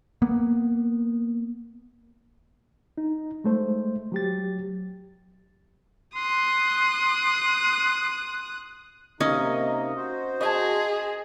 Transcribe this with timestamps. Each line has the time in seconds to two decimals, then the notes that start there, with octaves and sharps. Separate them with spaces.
0.22 A#3 B3
2.98 D#4
3.44 G#3 A3 C5
4.12 F#3 G4 A6
6.16 C6 D#6 F#6
9.21 C3 A#3 C#4 D#4 D#5
9.96 F#4 C5
10.41 G#4 D#5 G#5 A5